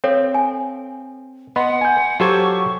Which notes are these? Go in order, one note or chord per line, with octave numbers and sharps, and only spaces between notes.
C4 A4 C#5 F5
G#5
B3 D#5 F#5 B5 C6
G#5 G6
F#3 F4 G4 A4 C5 C#6 G#6